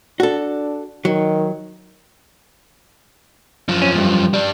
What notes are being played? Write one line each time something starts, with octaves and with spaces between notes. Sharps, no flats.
D4 F#4 A4
D#3 F#3
F#2 F3
C#4
D2 G2
G3 D4